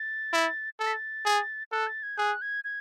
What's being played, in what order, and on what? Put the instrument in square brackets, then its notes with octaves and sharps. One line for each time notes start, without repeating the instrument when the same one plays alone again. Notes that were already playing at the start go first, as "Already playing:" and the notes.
Already playing: [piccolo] A6
[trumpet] E4
[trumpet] A4 [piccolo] A6
[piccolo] B6
A6
[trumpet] G#4
[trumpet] A4 [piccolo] F#6
[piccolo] A6
G#6
[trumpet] G#4 [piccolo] F#6
[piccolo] G#6
G#6